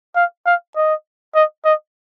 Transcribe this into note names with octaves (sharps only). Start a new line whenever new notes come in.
F5
F5
D#5
D#5
D#5